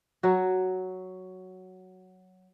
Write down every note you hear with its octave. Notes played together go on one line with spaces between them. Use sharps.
F#3 F#4